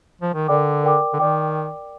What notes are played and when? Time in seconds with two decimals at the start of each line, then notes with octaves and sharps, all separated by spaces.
0.21 F3
0.34 D#3
0.48 D3 A#4 D5 G5 D6
0.83 A#4 D5 G5 D6
1.13 D3
1.19 D#3 A#4 D5 G5 D6